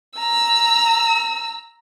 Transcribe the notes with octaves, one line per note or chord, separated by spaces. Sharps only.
A#5 E6